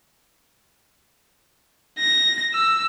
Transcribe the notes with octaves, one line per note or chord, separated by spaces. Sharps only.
A#6
E6